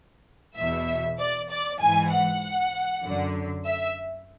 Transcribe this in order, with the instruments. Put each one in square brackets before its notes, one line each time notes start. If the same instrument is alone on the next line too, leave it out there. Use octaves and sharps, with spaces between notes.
[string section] E2 B2 E5
D5
D5
G#2 E3 G#5
F#5
F#2 D3
E5